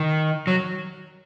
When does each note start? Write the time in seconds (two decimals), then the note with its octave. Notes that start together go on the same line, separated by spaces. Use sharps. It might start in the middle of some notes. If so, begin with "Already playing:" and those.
Already playing: D#3
0.47 F#3